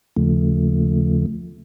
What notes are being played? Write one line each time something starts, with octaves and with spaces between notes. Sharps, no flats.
D#2 C#3 F3 A3